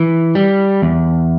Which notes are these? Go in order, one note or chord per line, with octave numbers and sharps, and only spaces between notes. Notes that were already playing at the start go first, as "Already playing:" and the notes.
Already playing: E3
G3
E2